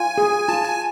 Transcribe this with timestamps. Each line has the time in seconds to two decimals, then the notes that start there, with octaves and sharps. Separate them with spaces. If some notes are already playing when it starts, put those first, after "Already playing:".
Already playing: F4 G#5
0.18 G#4
0.48 F4 A5
0.65 G#5